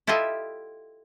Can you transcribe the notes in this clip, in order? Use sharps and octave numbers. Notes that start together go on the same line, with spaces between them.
E4 F4 G4 A4 D#5 E5